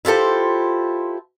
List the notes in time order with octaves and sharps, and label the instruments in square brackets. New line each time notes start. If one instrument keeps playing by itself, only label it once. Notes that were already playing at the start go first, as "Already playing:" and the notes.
[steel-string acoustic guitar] E4 F4 G4 A4 C5